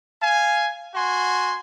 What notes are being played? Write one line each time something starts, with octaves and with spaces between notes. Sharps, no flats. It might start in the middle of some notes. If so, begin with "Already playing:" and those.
F5 G#5
F#4 G#5 C6